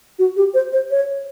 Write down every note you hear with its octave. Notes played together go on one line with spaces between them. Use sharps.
F#4
G4
C5
C5
C#5